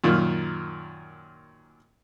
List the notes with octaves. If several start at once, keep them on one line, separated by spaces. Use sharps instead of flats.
F#2 A#2 D#3